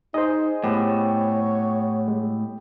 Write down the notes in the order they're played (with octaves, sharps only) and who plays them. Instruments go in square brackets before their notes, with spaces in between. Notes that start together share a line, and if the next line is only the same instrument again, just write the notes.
[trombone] D#4 [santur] G#4 [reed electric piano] C5 D#5
[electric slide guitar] A2 [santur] B3 G4 B4 [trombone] C#5
[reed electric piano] G#3